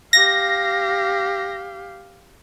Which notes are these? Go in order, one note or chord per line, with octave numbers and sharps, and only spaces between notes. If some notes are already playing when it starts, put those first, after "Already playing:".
G4 F5 A#6